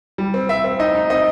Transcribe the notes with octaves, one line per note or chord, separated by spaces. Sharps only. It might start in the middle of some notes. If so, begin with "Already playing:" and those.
G3
C4
C4 E5
C4
D#4 D#5
D#4
C4 D#5